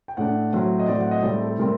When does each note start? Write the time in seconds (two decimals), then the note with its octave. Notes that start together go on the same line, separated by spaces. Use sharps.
0.08 G5
0.17 A2 A3 D4 F#5
0.53 A2 F#3 C4
0.79 D#5
0.88 A2 F#3 C4 D5
1.00 F#5
1.11 D#5
1.23 A2 G3 C4 D5
1.41 A4
1.59 A2 G3 C4 A#4